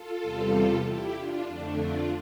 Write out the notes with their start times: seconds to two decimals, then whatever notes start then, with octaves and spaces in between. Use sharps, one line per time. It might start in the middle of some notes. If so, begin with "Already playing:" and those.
Already playing: F4 A4
0.22 E2 C3 G3
0.85 E4 G4
1.16 D4 F4
1.47 F2 D3 A3 D4
1.78 D4 F4